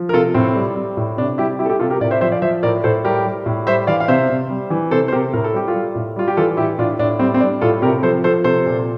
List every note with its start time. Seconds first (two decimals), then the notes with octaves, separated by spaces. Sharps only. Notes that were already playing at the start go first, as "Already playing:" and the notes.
Already playing: F3
0.09 A#4
0.13 C3 F4 A4
0.34 A2 C4
0.56 G3
0.76 G3
0.97 A2
1.17 C3 D4
1.38 G3 E4 G4
1.59 G3 E4 G4
1.66 A4
1.70 E4 G4
1.79 C3 F4 A4
1.90 G4 A#4
2.00 A2 A#4 D5
2.11 C5 E5
2.21 F3 C5 E5
2.32 D5 F5
2.42 F3 C5 E5
2.63 A2 A#4 D5
2.84 A2 A4 C5
3.05 G3 G4 A#4
3.25 G3
3.46 A2
3.67 G3 C5 E5
3.87 E3 D5 F5
4.00 F5
4.08 C3 C5 E5
4.29 C3
4.50 G3
4.70 E3
4.91 C3 A4 C5
5.08 C5
5.12 C3 G4 A#4
5.33 A2 A#4
5.44 A4
5.53 G3 G4
5.68 F4 A4
5.74 G3
5.95 A2
6.16 G3 F4
6.28 G4
6.37 E3 F4 A4
6.57 A2 E4 G4
6.78 A2 D4 F4
6.99 A2 D4
7.19 G3 C4
7.34 C4
7.40 G3 D4
7.61 A2 F4 A4
7.82 C3 G4 A#4
8.03 F3 A4 C5
8.24 F3 A4 C5
8.44 C3 A4 C5
8.66 A#2